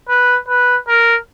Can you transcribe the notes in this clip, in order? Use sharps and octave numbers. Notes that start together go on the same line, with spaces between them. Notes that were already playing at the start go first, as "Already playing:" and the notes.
B4
B4
A#4